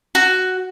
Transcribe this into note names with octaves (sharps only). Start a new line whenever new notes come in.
F#4